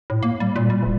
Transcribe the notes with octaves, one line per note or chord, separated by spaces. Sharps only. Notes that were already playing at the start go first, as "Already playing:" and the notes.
A2
A#3
G3
A#2
G3
D#1